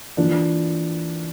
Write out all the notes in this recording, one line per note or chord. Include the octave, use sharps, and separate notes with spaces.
E3 A#3 D4 F4